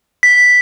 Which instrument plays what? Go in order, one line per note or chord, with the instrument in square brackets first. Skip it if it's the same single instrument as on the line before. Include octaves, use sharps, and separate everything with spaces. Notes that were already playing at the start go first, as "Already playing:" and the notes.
[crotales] B6